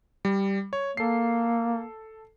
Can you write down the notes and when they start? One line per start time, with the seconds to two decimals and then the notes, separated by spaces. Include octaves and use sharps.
0.25 G3
0.73 C#5
0.97 A#3 A4 C7